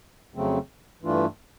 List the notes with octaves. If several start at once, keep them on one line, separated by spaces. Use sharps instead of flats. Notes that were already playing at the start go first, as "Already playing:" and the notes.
F2 C#3 F#3 A3 C4
G2 E3 A3 D4 F4